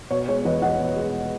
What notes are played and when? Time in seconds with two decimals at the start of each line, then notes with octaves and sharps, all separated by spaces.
0.11 B2 C#5
0.28 G#3 C#5
0.45 E2 B4 D#5
0.62 E2 D#5 F#5
0.80 B2
0.96 G#3